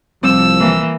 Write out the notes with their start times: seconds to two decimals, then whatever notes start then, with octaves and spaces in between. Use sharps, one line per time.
0.23 C2 F3 G3 C4 E6
0.59 E3 A#3